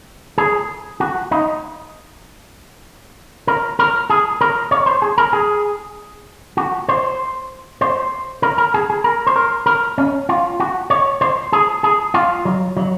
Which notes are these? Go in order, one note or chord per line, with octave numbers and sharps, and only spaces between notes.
G#4
F#4
D#4
A#4
A#4
G#4
A#4
C#5
C5
G#4
A#4
G#4
F#4
C5
C5
A#4
A#4
G#4
G#4
A#4
C5
A#4
A#4
C#4
F4
F#4
C#5
C5
G#4
G#4
F4
F#3
F#3